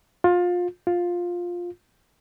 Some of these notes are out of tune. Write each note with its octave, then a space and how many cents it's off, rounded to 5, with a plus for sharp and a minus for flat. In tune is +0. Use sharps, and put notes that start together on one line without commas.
F4 +25
F4 +10